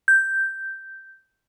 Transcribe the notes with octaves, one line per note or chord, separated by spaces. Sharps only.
G6